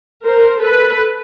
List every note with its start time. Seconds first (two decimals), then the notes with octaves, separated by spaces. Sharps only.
0.25 A#4 C5
0.61 A4 B4